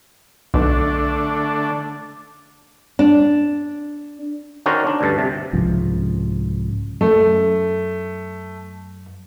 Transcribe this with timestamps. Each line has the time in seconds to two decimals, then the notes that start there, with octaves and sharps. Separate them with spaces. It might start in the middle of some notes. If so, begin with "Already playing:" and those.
0.54 B1 D3 A3 D4
2.99 D4
4.66 D#3 C#4 F#4 A#4 C5 D5
4.87 D4
5.01 D2 G2 A5
5.18 C3
5.53 C2 G#2 C#3 F3
7.01 F#2 A3